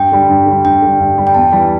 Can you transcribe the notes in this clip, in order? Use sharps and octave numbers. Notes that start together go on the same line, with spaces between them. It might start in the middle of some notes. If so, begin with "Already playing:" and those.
Already playing: G2 G5
D3 G3
G2
D3 G3
G2 G5
D3 G3
G2
D3 G3
G5
E2 A5
E3 G3